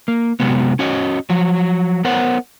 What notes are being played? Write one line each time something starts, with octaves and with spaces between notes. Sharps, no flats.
A#3
C3 F#3 G#3 B3
C#4 F#4 C#5 D#5
F3 F#3
B3 A#4 C5 C#5 F#5